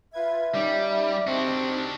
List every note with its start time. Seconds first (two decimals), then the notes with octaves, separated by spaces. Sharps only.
0.13 F4 B4 E5 G#6
0.54 G3 C#4 D#4 D5
1.27 C4 D4 D#4 F#4 G4